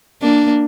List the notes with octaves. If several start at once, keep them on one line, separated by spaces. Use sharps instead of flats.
A#3 D4